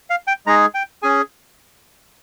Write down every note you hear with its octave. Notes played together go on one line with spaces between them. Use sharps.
F5
G5
G#3 D#4 G#4 A#5
G5
C#4 G#4 G#5